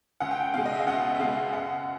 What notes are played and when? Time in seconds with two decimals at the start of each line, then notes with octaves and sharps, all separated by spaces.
0.20 C#2 F#5
0.31 G5
0.41 F#5
0.54 B2 G#3 F5
0.66 D#5
0.73 E5
0.79 F5
0.87 C#2 F#5
1.15 E5
1.19 B2 G#3 F5
1.52 F#2 F#5